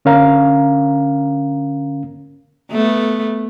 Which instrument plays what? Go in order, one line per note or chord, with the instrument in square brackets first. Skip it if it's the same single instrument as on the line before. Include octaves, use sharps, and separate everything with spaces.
[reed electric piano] D3 C#4 A#4 F5 A#5
[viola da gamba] A3 B3